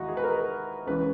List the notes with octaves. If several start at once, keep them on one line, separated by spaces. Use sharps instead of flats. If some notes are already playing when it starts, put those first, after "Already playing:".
Already playing: D#2 G#3 D#4 E4 F#4
G#4
B4
A#4
C#2 C#3 E3 G#3 B4